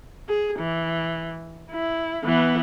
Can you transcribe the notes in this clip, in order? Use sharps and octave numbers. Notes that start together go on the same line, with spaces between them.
G#4
E3
E4
E3 B3